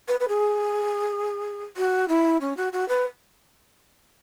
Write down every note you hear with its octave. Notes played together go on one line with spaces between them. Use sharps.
B4
B4
G#4
F#4
E4
C#4
F#4
F#4
B4